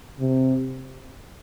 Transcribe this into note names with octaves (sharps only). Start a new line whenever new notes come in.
C3